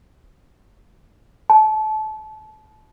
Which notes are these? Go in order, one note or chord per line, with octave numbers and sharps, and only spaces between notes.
A5